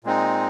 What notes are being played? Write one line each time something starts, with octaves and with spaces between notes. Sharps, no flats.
A#2 G#3 C4 D#4